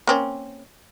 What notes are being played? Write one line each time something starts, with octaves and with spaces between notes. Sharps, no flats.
A#3 C4 C#4